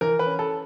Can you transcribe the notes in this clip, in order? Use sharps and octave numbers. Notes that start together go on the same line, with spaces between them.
E3 A#4
B4
C#4
A4